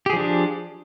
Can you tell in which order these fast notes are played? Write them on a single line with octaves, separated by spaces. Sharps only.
G4 G#4 F3 D4